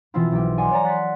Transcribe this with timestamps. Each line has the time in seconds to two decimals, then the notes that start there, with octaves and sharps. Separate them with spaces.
0.14 B2 E3 F3 C4 E4 F4
0.32 B1 G4
0.57 D5 D#5 F#5 G#5 C6 D6
0.71 C#5 D5 A#5
0.84 F#5 C6 F#6 A6 B6